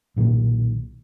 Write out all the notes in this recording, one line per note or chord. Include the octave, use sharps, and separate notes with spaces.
B1 A#2 D#3 A#3